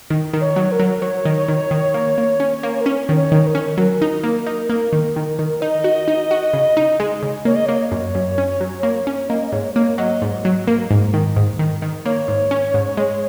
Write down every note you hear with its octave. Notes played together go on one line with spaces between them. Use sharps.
D#3
D#3
C#5
F#3
A#4
F#3
F#3 C#5
D#3
D#3
D#3
A#3
A#3
C#4
A#3
A#4
C#4 C#5
D#3
C#5
D#3
A#4
C#4
F#3 A#4
D#4
A#3
D#4
A#3
D#3
D#3
D#3
D#4 D#5
F#4
D#4
F#4
C#3
D#4
G#3
C#3
A#3 C#5
D#5
A#3 C#5
F#2
F#2
C#4
F#3
A#3
C#4
A#3 D#5
D#5
G#2 C#5
A#3 C#5
F#3 D#5
G#2
F#3
A#3
G#2
D#3
G#2
D#3
D#3
A#3 C#5
G#2
C#4
G#2
G#3